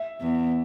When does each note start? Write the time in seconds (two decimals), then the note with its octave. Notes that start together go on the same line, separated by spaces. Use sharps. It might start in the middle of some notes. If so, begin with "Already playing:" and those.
Already playing: E5
0.21 E2